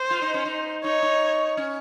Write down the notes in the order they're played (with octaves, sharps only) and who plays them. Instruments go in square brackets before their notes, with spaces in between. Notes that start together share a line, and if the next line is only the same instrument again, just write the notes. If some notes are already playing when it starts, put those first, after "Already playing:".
Already playing: [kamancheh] C5
[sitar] F4
D#4
C#4
D#4
[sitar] D#4 [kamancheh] C#5
[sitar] D#4
C#4